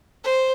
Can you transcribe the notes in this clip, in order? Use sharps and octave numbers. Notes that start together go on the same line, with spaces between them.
C5